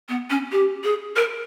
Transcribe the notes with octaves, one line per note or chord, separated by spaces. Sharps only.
B3
C#4
G4
G#4
A#4